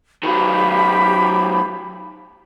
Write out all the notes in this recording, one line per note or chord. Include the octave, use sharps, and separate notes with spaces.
D#3 F#3 G4 F5 B5